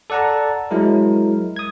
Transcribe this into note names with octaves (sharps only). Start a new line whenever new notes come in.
A4 D5 F#5 A5 A#5
F#3 G#3 E4 A#4
D#6 G#6